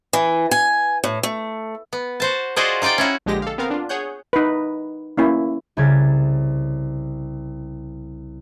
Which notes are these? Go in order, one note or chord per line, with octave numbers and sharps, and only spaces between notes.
E3
G#5
A2
A3
B3
F#4 C5 A5
F4 F#4 G#4 C5 D5 D#5
D#4 F4 D5 F5 G5
C#4 E4 F#4
A#1 D3 G#3 G4 A#6
A4 F5
B3 C4 A#4 F5
D4 F4
G#4 C#5 F#5 G6
D#4 B4
A#3 C#4 E4
C2 C#3 G#6 A6